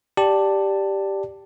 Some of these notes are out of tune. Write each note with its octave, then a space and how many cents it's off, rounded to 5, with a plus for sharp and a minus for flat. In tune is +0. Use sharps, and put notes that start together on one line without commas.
G4 +0 D5 +0 A5 +5